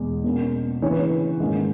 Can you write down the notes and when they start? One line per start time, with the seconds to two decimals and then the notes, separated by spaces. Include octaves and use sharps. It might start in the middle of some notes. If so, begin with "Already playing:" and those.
Already playing: E2 B2 G#3
0.24 B2 A#3 C#4
0.82 C#3 E3 B3 C#5
0.91 B4
1.00 C#5
1.40 G#2 D#3 A#3 C#4